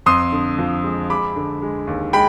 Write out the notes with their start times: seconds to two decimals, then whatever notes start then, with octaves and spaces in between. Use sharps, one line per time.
0.06 F2 C6 D#6
0.32 D3
0.58 F3
0.84 G#3
1.10 G#3 B5 D6
1.36 D3
1.62 G#3
1.87 D#2
2.13 G#3 G5 B5